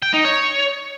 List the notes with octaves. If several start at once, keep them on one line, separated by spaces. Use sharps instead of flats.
G5
D#4
C#5